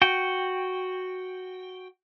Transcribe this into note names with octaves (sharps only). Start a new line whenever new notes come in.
F#4 G5